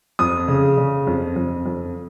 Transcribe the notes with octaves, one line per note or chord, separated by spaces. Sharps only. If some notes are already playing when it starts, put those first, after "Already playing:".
F2 D#6
C#3
C#3
F2
F2
F2